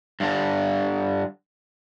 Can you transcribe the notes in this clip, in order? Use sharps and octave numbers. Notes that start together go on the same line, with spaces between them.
G2 D3